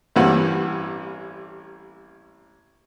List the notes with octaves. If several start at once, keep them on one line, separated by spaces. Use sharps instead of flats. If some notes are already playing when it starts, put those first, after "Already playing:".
A1 G2 E3 A#3 C4 F#5